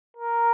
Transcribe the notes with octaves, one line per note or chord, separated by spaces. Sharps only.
A#4